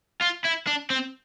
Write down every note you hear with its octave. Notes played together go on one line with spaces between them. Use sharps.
F4
E4
D4
C4